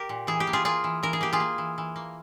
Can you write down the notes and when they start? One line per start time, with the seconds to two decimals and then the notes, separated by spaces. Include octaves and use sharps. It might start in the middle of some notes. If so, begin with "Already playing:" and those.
Already playing: G4 A#4
0.09 A#2
0.27 E3 G#4
0.40 G4
0.47 A#3
0.53 F4 G#4
0.65 A#3 F4 G#4
0.84 E3
1.03 E3 A#4
1.13 G#4
1.21 A#3 G4
1.33 F4 G#4
1.40 A#3
1.58 E3
1.78 E3
1.96 A#3